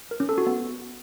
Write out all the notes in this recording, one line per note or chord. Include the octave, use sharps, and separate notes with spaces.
A#4
C#4
A4
F#4
B3